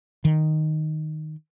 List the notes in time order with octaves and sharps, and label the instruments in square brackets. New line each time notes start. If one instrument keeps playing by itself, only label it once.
[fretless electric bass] D#3